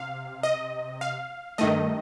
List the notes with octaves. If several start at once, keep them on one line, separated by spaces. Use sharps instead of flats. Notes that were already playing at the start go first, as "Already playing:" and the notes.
Already playing: C3 F5
D#5
F5
G2 D#3 A3 D#5